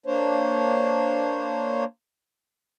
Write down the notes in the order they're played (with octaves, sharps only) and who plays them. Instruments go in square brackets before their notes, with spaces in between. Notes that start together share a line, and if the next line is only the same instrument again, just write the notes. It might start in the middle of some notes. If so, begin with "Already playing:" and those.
[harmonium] A#3 D4 C5 C#5